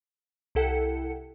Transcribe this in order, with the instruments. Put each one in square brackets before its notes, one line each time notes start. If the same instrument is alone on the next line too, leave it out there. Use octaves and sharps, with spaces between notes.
[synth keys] C2 E4 A4 F#5 G5 C#7